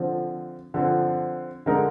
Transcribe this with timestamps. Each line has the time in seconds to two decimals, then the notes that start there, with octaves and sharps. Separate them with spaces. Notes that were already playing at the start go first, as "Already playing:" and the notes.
Already playing: D3 F3 C4
0.74 D3 F3 C4
1.66 D3 G#3 D#4 A#4